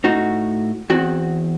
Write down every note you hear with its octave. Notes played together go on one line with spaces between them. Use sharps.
A2 D#4 F#4
E2 C4 F#4